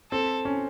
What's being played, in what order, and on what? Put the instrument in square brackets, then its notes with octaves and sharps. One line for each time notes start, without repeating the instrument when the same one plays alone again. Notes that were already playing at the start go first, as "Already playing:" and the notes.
[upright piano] C4 [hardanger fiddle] A4
[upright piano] C#4